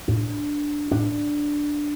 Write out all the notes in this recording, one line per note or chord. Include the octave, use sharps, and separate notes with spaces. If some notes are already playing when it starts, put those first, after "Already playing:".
A2 D4
A2 D4